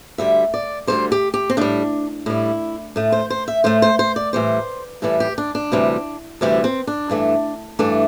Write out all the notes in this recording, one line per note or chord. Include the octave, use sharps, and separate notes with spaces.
D2 D3 G3 E5
D5
D2 D3 G3 C5
G4
G4
C4
A2 G3 D4
A2 G3 E4
A2 A3
C5
C5
E5
A2 A3 C5
C5
C5
D5
A2 E3 G3 C5
A2 E3 G3 A4
G4
D4
D4
D2 C3 E3 G3
D2 C3 E3 G3 E4
C4
D4
G2 E3 A3
G2 E3 A3 D4